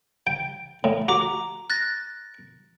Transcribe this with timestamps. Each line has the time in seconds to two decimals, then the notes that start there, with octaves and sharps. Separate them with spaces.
0.27 G5
0.84 A2
1.08 F#4 A#5 D6
1.70 F#6 A6 A#6